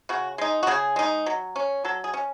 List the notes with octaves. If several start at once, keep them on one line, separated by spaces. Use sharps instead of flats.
C#3 F#4
G#3 D#4
F#4
C#3 G#4
G#3 D#4
F#3
C#4
F#3 A4
G#4
C#4